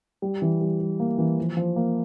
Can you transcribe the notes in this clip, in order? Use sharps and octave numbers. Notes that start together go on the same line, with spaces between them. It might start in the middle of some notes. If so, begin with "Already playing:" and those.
G3
E3
G3
G3
A#3
E3
F3
F3
A#3